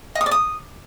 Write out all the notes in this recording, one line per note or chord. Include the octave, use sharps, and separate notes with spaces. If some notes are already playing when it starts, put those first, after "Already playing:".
D#5
D#6
D5
D#6